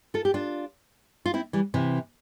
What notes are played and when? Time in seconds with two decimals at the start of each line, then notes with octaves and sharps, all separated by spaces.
0.14 F4 A4
0.25 G4
0.34 D4 F4
1.26 F4
1.34 C4 E4
1.53 E3 G3
1.74 C3 E3